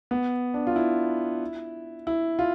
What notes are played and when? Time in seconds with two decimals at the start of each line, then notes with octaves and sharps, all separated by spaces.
0.11 B3
0.54 D4
0.67 F4
0.76 E4
2.07 E4
2.39 F4